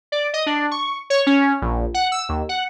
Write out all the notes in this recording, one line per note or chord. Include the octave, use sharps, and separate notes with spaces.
D5
D#5
D4
C#6
C#5
C#4
A#1
F#5
E6
D#2
F#5